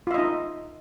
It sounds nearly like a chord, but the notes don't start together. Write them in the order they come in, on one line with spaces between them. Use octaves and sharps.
F4 E5 D#5 D#4